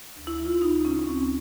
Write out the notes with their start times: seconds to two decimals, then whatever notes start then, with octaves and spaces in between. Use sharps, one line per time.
0.17 D2
0.27 E4
0.39 E3
0.45 F4
0.62 D2 D#4
0.85 C#3 C#4
0.99 C#4
1.07 D2 C4